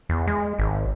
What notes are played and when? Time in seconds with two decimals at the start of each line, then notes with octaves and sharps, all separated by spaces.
0.09 E2
0.27 G#3
0.59 G#1